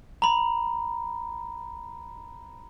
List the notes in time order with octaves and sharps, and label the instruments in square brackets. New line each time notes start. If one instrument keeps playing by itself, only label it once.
[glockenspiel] A#5 B5